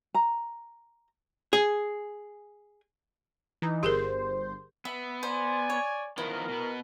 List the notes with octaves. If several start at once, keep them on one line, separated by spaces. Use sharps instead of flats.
A#5
G#4
E3 D#4
G1 G4 G#4 A#4 C5
B3 E5
C5 D5 G#5
C#5
D#3 F3 B3 E4 A#4
B2 B3